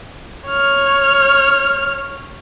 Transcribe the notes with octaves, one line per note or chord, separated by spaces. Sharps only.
C#5 F6